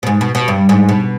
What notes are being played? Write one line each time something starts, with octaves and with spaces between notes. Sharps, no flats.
B2
G#2
B2
B2
G2
G#2
B2